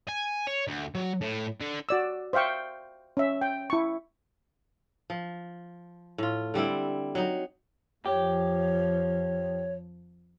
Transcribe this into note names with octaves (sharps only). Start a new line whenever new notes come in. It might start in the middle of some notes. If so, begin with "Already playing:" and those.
G#5
C#5
D2
F#3
A2
D3
F#4 D5 E6
C5 E5 F5 G5 C#6
C#4 E5
G5
E4 C#6
F3
A2 F4
D3 G3 C4 E4
F#3 D#4
F2 F3 G4 C#5